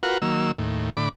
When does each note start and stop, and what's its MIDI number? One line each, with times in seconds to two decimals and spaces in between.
0.03 0.18 65
0.03 0.18 66
0.03 0.18 70
0.03 0.18 71
0.03 0.18 78
0.22 0.52 51
0.22 0.52 54
0.22 0.52 58
0.22 0.52 88
0.58 0.90 39
0.58 0.90 45
0.97 1.09 45
0.97 1.09 50
0.97 1.09 83
0.97 1.09 86